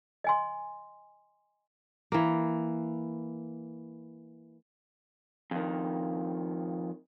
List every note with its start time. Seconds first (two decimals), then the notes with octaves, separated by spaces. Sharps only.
0.24 D#5 G#5 C6
2.12 E3 A#3
5.51 F2 D#3